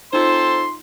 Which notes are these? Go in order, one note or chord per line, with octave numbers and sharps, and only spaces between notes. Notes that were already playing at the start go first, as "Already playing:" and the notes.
C4 D#4 F4 A4 C5 C6